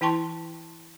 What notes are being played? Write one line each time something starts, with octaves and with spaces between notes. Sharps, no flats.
E3 E4 G5 A5 C6 C#6